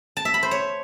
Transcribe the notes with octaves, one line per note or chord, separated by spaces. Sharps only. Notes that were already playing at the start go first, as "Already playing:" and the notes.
A5
E5
B5
C5
C#5